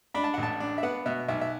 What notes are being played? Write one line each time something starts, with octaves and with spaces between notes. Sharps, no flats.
D4 B5
A5
A1 F#5
A5
D4
E5
B3 F#5
B2 E5
B1 E5
E5